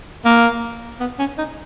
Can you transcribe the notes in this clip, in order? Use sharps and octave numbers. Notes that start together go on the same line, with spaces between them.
A#3
B3
C#4
D#4